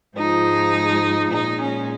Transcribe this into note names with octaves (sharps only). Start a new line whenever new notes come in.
G#2 F3 G#3 D#4
A#2 G#3 D#4
C#4